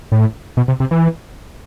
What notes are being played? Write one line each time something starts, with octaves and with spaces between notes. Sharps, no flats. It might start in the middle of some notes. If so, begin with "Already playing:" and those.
A2
B2
C3
C3
E3